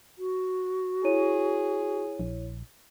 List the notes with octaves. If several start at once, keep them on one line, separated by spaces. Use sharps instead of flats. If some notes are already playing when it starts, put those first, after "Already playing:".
F#4
E4 G#4 C#5 D#7
A#1